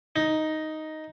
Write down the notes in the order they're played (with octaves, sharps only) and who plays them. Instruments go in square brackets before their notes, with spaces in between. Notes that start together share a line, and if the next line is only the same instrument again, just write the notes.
[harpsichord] D#4